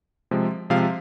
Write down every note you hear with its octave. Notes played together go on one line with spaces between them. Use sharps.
C3 F3 G#3
C3 F3 G#3 F5